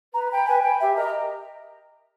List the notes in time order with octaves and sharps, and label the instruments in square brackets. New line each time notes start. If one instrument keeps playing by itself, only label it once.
[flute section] B4 [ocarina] A#5
[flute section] G5 B5
[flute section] B4 [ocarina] G#5
[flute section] G5 B5
[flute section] G4 [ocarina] E5
[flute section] A#4 D#5 A#5